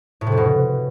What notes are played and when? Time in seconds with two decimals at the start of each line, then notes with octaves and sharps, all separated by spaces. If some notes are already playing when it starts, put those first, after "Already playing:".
0.21 A2
0.27 C3
0.32 F2
0.37 B2